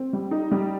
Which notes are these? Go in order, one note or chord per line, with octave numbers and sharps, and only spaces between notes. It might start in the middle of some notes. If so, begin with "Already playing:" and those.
Already playing: C4
G3
D#4
G3